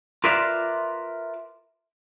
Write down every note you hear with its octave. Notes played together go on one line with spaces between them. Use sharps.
F4 A#4 B4 D5 E5 F5